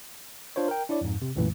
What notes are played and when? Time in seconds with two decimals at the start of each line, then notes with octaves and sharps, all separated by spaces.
0.56 D4 F4 C5 C#5
0.68 A#4 G5
0.89 D4 E4 C#5 D5
1.01 F2 G#2
1.22 C3
1.36 B1 F#2 A#2 E3 A3